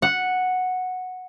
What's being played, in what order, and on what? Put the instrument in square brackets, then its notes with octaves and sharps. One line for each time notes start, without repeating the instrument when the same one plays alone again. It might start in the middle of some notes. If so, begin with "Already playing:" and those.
[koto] F#5